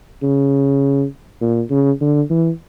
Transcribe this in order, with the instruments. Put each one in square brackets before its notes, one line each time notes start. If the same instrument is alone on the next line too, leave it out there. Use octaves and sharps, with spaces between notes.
[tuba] C#3
A#2
C#3
D3
E3